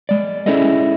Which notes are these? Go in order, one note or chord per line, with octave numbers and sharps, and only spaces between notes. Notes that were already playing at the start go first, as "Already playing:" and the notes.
G#3 D5
C#4 E4 G#4 A4 D#5